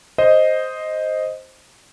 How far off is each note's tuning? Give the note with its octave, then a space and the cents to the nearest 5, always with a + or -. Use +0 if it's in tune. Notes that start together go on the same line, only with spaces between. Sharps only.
C5 +0 D#5 +0